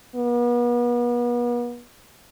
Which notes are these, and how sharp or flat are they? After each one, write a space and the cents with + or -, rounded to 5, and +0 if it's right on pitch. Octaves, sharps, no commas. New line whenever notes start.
B3 -40